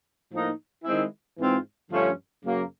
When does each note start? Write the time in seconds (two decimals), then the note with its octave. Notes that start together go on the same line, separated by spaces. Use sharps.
0.32 A2 F3 A#3 D#4
0.84 D#3 G#3 C4 E4
1.38 G#2 E3 G#3 C4 F4
1.91 G2 D3 F3 A3 C#4
2.44 F#2 C#3 F#3 A#3